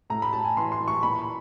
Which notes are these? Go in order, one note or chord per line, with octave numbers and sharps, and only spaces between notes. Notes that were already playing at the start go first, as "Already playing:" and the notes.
A2 A#5
B5
A2 A5
G#5
E3 C6
C6
E3
C#6
A#2 B5